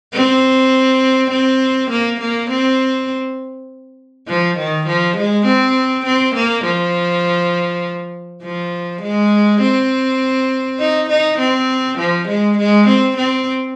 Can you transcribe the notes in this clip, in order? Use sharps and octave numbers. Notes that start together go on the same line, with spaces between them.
C4
C4
A#3
A#3
C4
F3
D#3
F3
G#3
C4
C4
A#3
F3
F3
G#3
C4
D#4
D#4
C4
F3
G#3
G#3
C4
C4